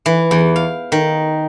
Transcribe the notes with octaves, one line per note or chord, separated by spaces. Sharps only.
E3
E2
F5
D#3